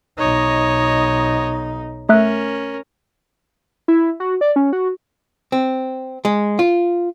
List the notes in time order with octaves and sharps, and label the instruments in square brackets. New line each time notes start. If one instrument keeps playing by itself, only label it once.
[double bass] B1 D#4 [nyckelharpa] C#5 D#5
[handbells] A3 E5 F#6 [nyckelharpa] C#4 A#4
[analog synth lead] E4
F#4
D5
C#4
F#4
[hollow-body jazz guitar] C4
G#3
F4